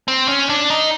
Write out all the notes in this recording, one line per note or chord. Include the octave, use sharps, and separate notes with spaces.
C4
C#4
D4
D#4